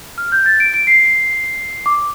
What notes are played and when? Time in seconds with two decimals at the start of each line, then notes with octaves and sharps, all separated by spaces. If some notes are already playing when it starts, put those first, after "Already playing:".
0.18 F6
0.32 G6
0.46 A6
0.60 D7
0.74 D7
0.87 C7
1.86 D6